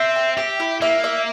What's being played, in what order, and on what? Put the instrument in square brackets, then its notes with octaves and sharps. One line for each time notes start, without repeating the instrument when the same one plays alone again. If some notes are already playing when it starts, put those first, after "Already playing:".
Already playing: [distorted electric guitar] C4 [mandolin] E5
[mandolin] G5
[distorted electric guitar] G4 [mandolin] E5
[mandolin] E4
[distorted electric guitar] A#3 [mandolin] E5
[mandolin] E5